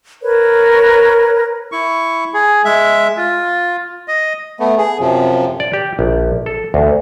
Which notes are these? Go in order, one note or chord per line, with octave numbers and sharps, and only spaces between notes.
A#4 B4 C#5
E4 C#6
G#4
G#3 E5
F4
D#5
A3 B3
G#4
F#2 C3 F3
D5
G4
A#1
A4
D2